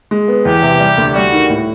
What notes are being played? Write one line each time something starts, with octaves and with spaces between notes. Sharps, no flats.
G#3
B3
E2 G4
C3
G3
D2
G3 F#4
D#3
A2